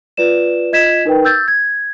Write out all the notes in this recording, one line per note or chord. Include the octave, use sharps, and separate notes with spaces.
F4 B4 D5 E7
F4 D#5 G#6 B6 E7
D#4 A#4 B4 G5
E6 G6 A6
G#6